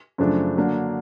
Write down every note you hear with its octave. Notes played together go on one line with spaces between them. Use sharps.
F#2 C#3 F3 A3 D4
D3 F#3 A#3 D4